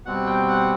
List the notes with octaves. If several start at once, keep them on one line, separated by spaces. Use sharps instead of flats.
B2 G3 C4 F#5
G5
F#5